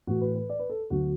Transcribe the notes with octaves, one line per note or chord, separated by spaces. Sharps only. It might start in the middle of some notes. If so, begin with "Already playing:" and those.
A2 E3 F#4
B4
B4
D5
B4
A4
D2 D3 F#3 F#4